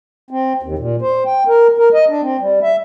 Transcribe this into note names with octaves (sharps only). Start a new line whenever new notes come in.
C4
D#2
A#2
C5
G5
A#4
A#4
D#5
D4
C4
G3
E5